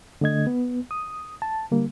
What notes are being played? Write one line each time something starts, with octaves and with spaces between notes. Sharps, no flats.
D3 A3 D#5 G#6
B3
D#6
A5
D3 G3 A#3